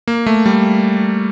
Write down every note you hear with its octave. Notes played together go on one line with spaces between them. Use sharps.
A#3
A3
G3